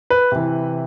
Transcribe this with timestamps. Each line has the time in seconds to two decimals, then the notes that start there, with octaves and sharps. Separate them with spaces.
0.10 B4
0.32 C3 E3